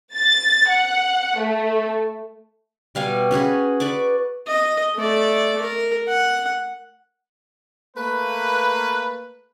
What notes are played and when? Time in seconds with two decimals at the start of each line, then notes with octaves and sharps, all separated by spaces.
0.15 A6
0.69 F#5
1.39 A3
2.95 B2 G3 F5 G#5
3.31 C#4 F#4 G#4 B4
3.80 B4 D5 C#6 D6
4.48 D#5
4.96 A3 D5
5.61 A#4
6.08 F#5
7.97 A3 A#3 B4